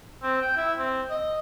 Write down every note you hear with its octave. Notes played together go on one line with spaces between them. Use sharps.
C4
G5
E4
C4
D#5